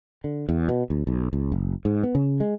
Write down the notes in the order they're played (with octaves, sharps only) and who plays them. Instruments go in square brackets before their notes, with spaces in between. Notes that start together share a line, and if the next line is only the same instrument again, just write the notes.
[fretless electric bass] D3
E2
B2
D2
B1
C#2
F#1
G#2
B3
C#3
G#3